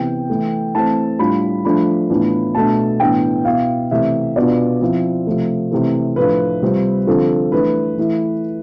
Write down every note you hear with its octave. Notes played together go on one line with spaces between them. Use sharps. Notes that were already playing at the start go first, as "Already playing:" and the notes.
Already playing: C3 E3 B3 G5
E3 A3 E4
E3 A3 C4 A5
A2 G3 D4 F4 B5
F3 A3 D4 B5
A2 E3 B3 D4 F4
B2 A3 D4 A5
A2 E3 B3 D4 G5
B2 B3 E4 F5
C3 E3 A3 E5
B2 B3 D4 F4 D5
F3 C4 E4
C3 F3 A3
C3 E3 A3
A2 F3 A3 D4 F4 B4
C3 G3 C4 F4
D3 F3 C4 F4 A4
E3 A3 D4 B4
E3 A3 E4